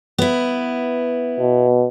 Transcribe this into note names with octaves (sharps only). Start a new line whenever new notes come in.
B3 E4
B2